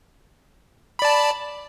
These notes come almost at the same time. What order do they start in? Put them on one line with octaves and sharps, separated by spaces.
B5 D5 A5